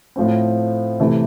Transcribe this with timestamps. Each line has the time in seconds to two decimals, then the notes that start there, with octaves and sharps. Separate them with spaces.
0.16 A2 F3 A3 C4
1.00 C3 E3 A3